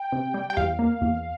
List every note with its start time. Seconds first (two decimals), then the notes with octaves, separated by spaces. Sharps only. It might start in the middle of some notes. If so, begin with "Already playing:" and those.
Already playing: G5
0.12 C3
0.34 G3
0.50 G5
0.57 E2 F5
0.79 A#3
1.02 E2